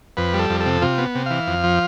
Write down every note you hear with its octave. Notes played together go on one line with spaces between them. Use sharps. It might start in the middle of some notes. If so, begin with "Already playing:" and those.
F2 B4
G3
A4
F2
A4
C3
C3 F4
B3
C3
E3 F5
F2
F3